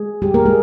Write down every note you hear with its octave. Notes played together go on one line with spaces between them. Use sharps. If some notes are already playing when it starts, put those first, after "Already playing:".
Already playing: G#3 G#4
G3 G4
A#3 A#4
G#3 G#4